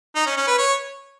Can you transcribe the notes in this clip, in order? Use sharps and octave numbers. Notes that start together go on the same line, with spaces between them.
D#4
C#4
C#4
B4
C#5